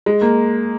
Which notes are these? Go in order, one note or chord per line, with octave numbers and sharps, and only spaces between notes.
G#3
A#3